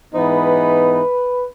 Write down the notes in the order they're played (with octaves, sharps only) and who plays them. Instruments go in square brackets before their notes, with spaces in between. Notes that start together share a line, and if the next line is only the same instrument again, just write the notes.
[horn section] G#2 E3 B3 D#4 B4